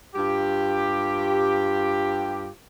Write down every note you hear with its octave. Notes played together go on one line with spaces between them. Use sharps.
G2 F4 G4